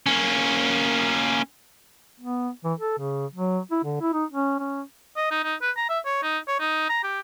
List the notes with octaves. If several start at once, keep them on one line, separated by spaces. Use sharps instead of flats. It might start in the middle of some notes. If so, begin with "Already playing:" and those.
A#3 C#4
B3
E3
A4
C#3
F#3
E4
D3
E4
D#4
C#4
C#4
D#5
D#4
D#4
B4
A#5
E5
C#5
D#4
C#5
D#4
A#5
G4